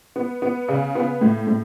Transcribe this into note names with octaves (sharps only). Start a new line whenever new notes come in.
B3
B3
C#3
B3
A2
A2